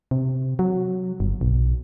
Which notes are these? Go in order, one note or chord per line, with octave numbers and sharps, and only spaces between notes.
C3
F#3
G1
B1